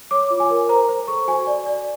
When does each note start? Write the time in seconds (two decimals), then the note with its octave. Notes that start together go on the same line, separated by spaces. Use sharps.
0.11 C#5 D6
0.30 F4
0.40 G#5
0.50 A#4
0.69 C5 A#5
0.89 C5
1.08 A4 C#6
1.28 F#4 G#5
1.47 D5
1.66 D5